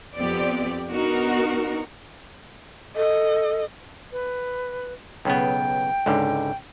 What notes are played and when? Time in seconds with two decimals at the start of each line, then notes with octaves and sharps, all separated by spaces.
0.15 F2 B3 C4 G4 D5
0.88 B3 D4 D#4 F#4 A#4
2.96 A4 D#5
4.12 B4
5.25 B1 C#3 B3 G5
6.06 C#2 G#2 D3